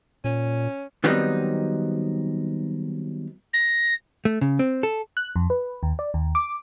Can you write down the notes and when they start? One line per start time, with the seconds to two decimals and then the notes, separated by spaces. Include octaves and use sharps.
0.24 A#2 C#4
1.04 D#3 F#3 G3 B3 C4 D#4
3.53 A#6
4.25 A3
4.41 C#3
4.59 C4
4.83 A4
5.17 F#6
5.36 F2
5.50 B4
5.83 D#2
5.99 D5
6.14 D#2
6.35 D6